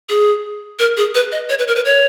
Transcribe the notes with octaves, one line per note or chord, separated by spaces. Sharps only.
G#4
A#4
G#4
B4
D#5
C#5
B4
A#4
B4
C#5